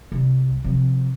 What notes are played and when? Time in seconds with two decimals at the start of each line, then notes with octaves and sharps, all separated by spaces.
0.12 C2
0.64 C3 F3